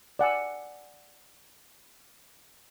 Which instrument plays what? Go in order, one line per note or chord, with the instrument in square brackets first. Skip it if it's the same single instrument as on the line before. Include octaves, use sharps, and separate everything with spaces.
[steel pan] D5 F#5 G#5 E6